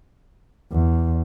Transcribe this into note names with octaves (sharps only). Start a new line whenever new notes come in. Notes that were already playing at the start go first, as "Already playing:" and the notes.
E2